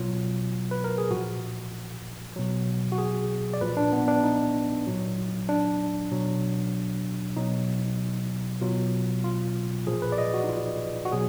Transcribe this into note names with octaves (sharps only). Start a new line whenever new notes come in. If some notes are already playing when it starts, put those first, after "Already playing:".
Already playing: B2 F#3 F4
B4
A#4
G#4
A#2 F3 F#4
B2 F#3
F#4
G#4
D5
A#2 F3 B4
D4
B3
D4
D#4
A#2 F#3
D4
B2 F#3
B2 F#3 D#4
B2 F#3 F4
F4
A#2 F3 G#4
B4
D5
D#5
F#4
D#4
F4
F#4
B2 F#3 G#4